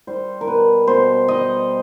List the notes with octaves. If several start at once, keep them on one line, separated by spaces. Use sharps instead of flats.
G3 C5
A#4
B2 B4
B2 C5
G3 D#5